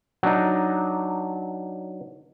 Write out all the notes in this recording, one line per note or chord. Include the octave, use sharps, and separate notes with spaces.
F#3 D4 D#4